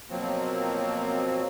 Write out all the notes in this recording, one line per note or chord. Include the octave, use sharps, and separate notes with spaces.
B2 F3 F#3 A#3 C4